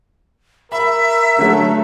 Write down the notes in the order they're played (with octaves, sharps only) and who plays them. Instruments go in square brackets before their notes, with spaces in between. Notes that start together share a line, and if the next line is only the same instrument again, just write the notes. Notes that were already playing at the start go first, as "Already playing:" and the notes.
[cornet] A#4 [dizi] E5 [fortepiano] B5
[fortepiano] D3 F#3 A4 [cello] A3